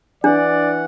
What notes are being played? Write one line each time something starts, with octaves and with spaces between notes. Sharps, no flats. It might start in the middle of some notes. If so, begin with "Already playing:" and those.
E3 D4 D5 F#5